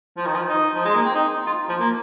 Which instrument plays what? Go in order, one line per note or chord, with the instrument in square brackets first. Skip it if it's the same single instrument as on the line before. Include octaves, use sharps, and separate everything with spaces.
[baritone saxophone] F3
D#3
F3
D#4
F3
G#3
A#3
C4
D#4
F4
F3
A#3